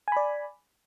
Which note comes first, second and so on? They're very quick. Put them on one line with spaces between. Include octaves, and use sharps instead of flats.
G#5 B5 D5